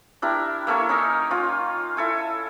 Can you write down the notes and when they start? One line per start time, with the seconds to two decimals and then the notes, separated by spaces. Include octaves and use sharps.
0.22 D4 E4 G4 A#4
0.67 A#3 E4 A4 C#5
0.89 C#4 D#4 A#4
1.31 C#4 F4
1.97 E4 A4 G#5